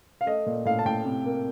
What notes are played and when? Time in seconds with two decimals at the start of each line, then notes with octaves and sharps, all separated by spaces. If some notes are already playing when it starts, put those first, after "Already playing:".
0.21 F5
0.26 A3 D#5
0.46 A#2
0.65 A2 F5
0.79 A5
0.85 A2 G5
1.05 C3
1.25 A#3